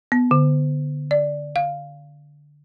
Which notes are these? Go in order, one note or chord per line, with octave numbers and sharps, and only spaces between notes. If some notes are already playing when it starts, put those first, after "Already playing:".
B3
D3
D5
F5